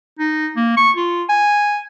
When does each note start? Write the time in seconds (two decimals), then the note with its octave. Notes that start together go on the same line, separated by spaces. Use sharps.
0.19 D#4
0.56 A#3
0.77 C#6
0.96 F4
1.29 G#5